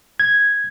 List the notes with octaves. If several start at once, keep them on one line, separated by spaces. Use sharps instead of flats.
G#6